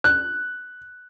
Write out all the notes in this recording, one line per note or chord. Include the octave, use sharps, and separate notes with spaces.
F#6